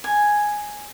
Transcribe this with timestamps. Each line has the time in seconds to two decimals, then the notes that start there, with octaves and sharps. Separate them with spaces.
0.04 G#5